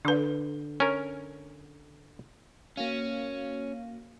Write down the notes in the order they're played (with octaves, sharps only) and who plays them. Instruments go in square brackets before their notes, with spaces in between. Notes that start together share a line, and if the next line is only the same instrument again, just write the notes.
[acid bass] D3 [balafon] D4 B4
[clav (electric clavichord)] C#4 A#4
[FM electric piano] A#3 F#4 F5 [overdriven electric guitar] C#4